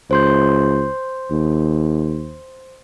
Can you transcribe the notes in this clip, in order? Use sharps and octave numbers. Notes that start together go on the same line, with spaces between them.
C#2 C5 C6 G6
D#2